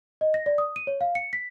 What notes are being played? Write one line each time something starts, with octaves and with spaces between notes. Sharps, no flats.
D#5
A#6
D5
D#6
D#7
C#5
F5
C#7
B6